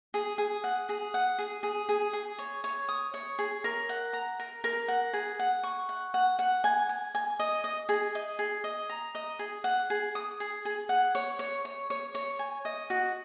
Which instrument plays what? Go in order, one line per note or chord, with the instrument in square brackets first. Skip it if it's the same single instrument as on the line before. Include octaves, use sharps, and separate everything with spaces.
[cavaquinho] G#4
G#4
F#5
G#4
F#5
G#4
G#4
G#4
G#4
C#5
C#5
D#6
C#5
G#4
A#4
F#5
A#5
A#4
A#4
F#5
G#4
F#5
C#6
F#5
F#5
F#5
G#5
G#5
G#5
D#5
D#5
G#4
D#5
G#4
D#5
A#5
D#5
G#4
F#5
G#4
D#6
G#4
G#4
F#5
C#5
C#5
C#5
C#5
C#5
G#5
D#5
F#4